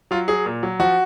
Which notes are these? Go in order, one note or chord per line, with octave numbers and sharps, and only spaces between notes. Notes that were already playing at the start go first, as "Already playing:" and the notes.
F#3 F4
F#3 G#4
A#2
F#3
F3 F#4